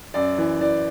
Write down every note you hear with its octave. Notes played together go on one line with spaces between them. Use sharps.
F#2 D5
E3
E3 D5